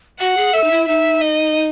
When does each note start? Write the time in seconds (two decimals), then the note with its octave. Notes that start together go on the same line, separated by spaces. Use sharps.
0.19 F#4 F#5
0.37 G#4
0.53 A4 E5
0.64 D#4
0.71 E4
0.88 D#4 E5
1.21 D#5